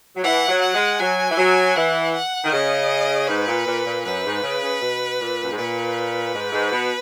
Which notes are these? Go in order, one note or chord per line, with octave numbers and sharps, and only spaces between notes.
F#3
E3 F#5
F#3
F#5
G#3
F#3 G#5
E3
F#3
E3 F#5
F#5
D#3
C#3 D#5
G#2 B4
A#2
A#2
A#2
F#2 B4
G#2
C#3
C#3
B2
A#2
F#2
G#2
A#2 B4
G#2
G#2
B2